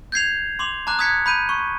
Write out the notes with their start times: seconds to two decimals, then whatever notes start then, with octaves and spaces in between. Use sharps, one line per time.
0.12 G6 G#6 C7 F7
0.59 C6 D6 F7
0.87 A5 A#5 D6 F#6
0.99 D#6 F#6 G#6 B6 C#7
1.26 B5 G6 D#7
1.49 C#6